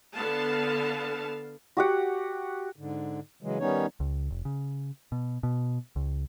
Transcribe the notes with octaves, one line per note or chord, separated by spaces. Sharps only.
D3 B3 F5 A5
F#4 G4 F#5
G#2 D3
C#3 E3 F#3 G#3
D#3 G3 B3 C#4 D#4 C#5
C#2
F1
C#3
B2
B2
C#2